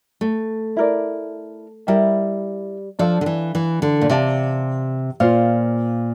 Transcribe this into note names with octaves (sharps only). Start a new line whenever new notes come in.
A3
E4 A#4 D5
G3 E4 A#4 E5 G5
F3 D4 A4 D5 F5
D3
E3
E3
D3
A#2
C3 G4 D5 F5 A5
A#2 F4 C5 F5